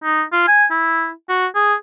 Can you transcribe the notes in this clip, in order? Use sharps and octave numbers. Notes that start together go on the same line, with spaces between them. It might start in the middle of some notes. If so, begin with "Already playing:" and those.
D#4
F4
G#5
E4
F#4
G#4